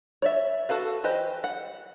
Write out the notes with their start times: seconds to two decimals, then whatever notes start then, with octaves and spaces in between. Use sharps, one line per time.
0.22 C#5 D5 E5
0.69 F#4 A4 B4 F5
1.04 E3 G4 B4 C5 D#5
1.44 F#5